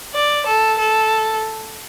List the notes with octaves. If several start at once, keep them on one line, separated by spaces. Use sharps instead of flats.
D5
A4
A4